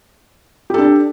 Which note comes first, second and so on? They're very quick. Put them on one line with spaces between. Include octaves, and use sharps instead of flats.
G4 A4 D4